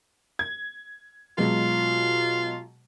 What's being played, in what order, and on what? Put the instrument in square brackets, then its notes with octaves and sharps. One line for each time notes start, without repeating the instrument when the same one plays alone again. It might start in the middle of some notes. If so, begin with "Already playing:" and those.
[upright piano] G#6
[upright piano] B2 F#3 G#3 [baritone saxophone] F4